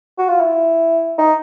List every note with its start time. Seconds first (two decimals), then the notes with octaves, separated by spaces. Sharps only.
0.18 F#4
0.29 F4
0.40 E4
1.18 D#4